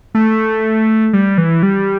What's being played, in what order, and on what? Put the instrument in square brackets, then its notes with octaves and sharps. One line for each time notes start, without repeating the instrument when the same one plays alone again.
[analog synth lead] A3
G3
E3
G3